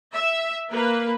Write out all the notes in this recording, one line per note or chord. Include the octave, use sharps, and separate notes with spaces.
E5
A#3 B4